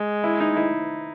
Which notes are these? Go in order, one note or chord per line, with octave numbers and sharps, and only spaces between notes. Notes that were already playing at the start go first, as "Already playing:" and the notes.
Already playing: G#3
E4
D#4
E4